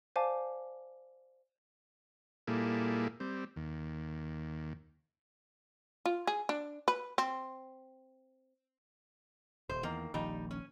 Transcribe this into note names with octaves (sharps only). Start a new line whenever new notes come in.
C5 D5 F5 G#5 A5 D6
A#2 G3 A#3 E4 G#4 A4
G3 C4
D#2
F4
G#4
D4
B4
C4
D#1 C5
E2 D#3 A#3
D#1 A#1 D#2 G3 D#4
C#4